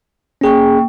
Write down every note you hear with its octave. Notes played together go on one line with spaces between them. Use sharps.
A#3 C#4 G#4 G5 C#6